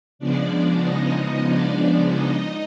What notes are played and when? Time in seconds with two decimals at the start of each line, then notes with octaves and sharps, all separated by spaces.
0.19 C#3 F3 G#3 B3 D4 D5
0.83 D#4 D#5
1.48 D4 D5
2.12 D#4 D#5